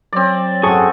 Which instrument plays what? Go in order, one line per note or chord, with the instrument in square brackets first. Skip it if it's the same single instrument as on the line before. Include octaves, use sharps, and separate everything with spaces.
[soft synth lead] F#3 [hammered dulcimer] C4 D5
[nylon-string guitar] F#2 F#5 [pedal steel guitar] G#4 A4 C#6